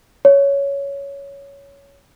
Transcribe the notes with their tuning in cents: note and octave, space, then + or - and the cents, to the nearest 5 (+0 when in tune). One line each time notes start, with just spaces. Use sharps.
C#5 +10